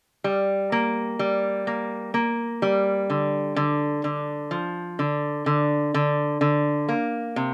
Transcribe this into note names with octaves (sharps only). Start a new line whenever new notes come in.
G3
A#3
G3
A#3
A#3
G3
D3
D3
D3
F3
D3
D3
D3
D3
A#3
C3